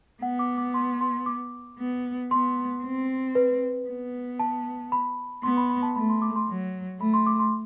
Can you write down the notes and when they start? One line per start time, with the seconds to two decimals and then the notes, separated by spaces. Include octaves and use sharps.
0.22 B3 F#5
0.39 D6
0.58 D6
0.74 C6
1.01 C6
1.26 D6
1.79 B3
2.31 B3 C6
2.83 C4
3.35 B4
3.88 B3
4.39 A5
4.92 B5
5.43 B3 C6
5.57 B5
5.70 B5
5.83 A5
5.96 A3 B5
6.09 C6
6.22 D6
6.36 C6
6.48 F#3
7.01 A3 B5
7.14 C6
7.26 D6
7.40 C6